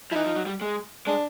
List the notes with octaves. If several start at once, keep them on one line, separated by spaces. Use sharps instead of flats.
F3 E4
E3 D#4
F3
F#3
G3
G#3
G#3 D4